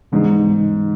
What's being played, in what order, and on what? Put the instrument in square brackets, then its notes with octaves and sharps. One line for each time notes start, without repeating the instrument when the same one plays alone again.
[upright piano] G#2 [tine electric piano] C#3 E3 G3 B3 D#4